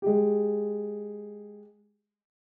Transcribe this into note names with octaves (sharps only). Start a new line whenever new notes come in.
G#3 G4